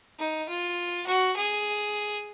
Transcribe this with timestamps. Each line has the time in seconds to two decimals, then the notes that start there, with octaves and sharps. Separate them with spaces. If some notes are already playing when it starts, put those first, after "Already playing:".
0.19 D#4
0.49 F4
1.06 F#4
1.36 G#4